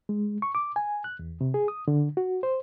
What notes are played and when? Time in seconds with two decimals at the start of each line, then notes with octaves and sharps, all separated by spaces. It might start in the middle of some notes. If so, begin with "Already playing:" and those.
0.09 G#3
0.42 C#6
0.55 D6
0.76 G#5
1.04 F#6
1.19 E2
1.41 C3
1.54 G#4
1.68 D#6
1.88 D3
2.17 F#4
2.43 C5